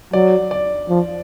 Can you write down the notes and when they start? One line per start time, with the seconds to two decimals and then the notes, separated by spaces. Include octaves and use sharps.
0.13 F#3 D5
0.51 D5
0.89 F3